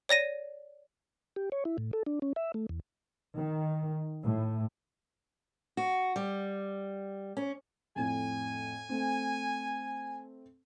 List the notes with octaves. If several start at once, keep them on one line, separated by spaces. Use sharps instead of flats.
C#5 D5 A#6 D#7
G4
C#5
E4
A2
A4
D4
C#4
E5
A3
E2
D#3
A2
F#4
G3
C#4
F2 A2 G#5
A3 C4